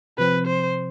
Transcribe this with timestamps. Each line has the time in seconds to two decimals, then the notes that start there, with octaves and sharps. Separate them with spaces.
0.18 C3 F3 C4 B4
0.47 C5